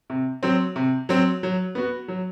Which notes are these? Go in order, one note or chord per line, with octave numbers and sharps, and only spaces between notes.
C3
F#3 C4
C3
F#3 C4
F#3
B3 F#4
F#3